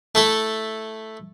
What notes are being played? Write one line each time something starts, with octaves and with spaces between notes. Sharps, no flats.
A3 E4 A4